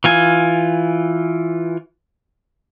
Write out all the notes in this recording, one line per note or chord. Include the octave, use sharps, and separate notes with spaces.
E3 F4 G#5